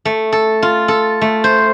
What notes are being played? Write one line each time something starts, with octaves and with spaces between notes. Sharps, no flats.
A3
A4
F4
A4
A3
C5